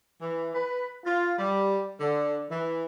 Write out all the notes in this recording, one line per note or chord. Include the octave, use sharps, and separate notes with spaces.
E3
B4
F4
G3
D3
E3